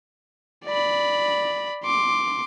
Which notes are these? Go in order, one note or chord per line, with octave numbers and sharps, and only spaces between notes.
D5 B5
C6 D6